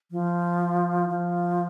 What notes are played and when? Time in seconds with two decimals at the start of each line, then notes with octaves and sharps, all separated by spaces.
0.11 F3
1.10 F3